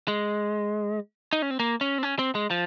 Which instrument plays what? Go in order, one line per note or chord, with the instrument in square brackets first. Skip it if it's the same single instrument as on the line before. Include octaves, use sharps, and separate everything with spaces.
[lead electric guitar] G#3
D#4
C#4
C4
A#3
C#4
C4
C#4
C4
G#3
F3